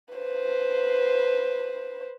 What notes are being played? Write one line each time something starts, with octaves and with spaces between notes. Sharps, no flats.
B4 C5